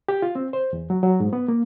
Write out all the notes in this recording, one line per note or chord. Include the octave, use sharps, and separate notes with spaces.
G4
F4
C4
C5
E2
F#3
F#3
G#2
B3
A#3